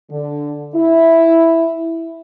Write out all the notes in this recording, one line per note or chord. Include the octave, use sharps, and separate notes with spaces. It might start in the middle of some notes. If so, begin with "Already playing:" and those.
D3
E4